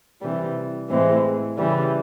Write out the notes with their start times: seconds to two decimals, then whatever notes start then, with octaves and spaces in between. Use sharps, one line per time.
0.22 C3 E3 G3
0.89 A2 E3 G#3 C4
1.57 C#3 E3 G3